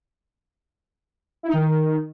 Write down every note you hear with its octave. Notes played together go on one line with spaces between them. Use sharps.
E4
D#4
D#3